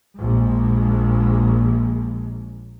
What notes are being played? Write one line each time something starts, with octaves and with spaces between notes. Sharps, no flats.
A#1 G#3